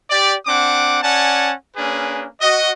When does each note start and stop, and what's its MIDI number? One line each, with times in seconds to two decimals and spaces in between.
0.10 0.35 67
0.10 0.35 74
0.47 1.01 60
0.47 1.01 62
0.47 1.01 78
0.47 1.01 86
1.03 1.53 61
1.03 1.53 74
1.03 1.53 78
1.03 1.53 80
1.03 1.53 81
1.76 2.26 58
1.76 2.26 61
1.76 2.26 62
1.76 2.26 68
1.76 2.26 71
2.40 2.70 66
2.40 2.70 75